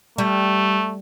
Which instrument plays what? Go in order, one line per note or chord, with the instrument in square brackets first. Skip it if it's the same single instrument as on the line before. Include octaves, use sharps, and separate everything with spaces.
[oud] G3 [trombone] A3